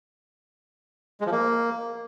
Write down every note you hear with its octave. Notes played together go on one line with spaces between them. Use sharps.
G#3
F3
A#3